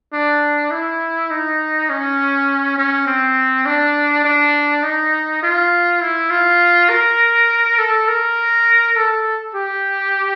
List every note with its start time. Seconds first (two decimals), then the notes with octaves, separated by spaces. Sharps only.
0.13 D4
0.71 E4
1.30 D#4
1.90 C#4
2.78 C#4
3.07 C4
3.66 D4
4.25 D4
4.83 D#4
5.43 F4
6.01 E4
6.30 F4
6.89 A#4
7.79 A4
8.08 A#4
8.96 A4
9.55 G4